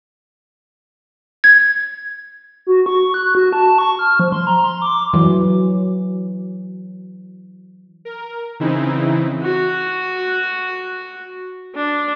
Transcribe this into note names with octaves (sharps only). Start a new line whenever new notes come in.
G#6
F#4
C#6
F#6
F#4
A5
C#6
F6
F3
C6
A#5
C6
D6
E3 F#3
A#4
C#3 E3 C4 D#4 E4
F#4
D4